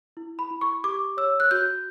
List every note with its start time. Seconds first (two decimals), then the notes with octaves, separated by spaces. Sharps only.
0.17 E4
0.39 B5
0.51 E4
0.61 C#6
0.84 G4 D6
1.17 C#5 E6
1.40 F#6
1.51 F#4 G6